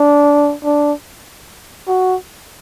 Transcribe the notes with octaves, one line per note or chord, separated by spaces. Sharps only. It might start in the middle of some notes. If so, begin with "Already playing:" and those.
Already playing: D4
D4
F#4